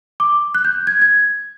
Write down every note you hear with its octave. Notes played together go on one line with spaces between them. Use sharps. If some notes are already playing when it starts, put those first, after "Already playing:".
D6
F#6
G6
G#6
G#6